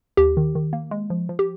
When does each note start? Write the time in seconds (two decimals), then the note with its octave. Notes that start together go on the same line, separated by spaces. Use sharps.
0.17 D#2 G4
0.37 D#3
0.55 D#3
0.73 A#3
0.91 G#3
1.10 F3
1.29 F3
1.39 G4